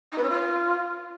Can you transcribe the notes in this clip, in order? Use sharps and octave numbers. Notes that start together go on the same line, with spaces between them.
D#4
B4
C#4
F4